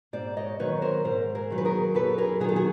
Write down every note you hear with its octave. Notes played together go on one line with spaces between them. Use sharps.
G#2 C5 D5
C#5 D#5
D#3 F#3 B4 C#5
A#4 C5
G#2 A#4 C5
G#4 A#4
D#3 F#3
B4
G#4 A#4
F#2 A4 B4
G#4 A#4
D#3 F#3 G#4 A4
F#4 G#4